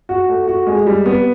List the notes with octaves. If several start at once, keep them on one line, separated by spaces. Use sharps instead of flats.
F#4
A3
F#4
G#3
G3
B3